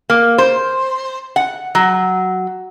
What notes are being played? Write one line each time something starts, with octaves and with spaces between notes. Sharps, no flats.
A#3
C5
F#5
F#3